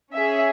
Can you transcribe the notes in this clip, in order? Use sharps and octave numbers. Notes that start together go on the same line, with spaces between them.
C#4 G#4 E5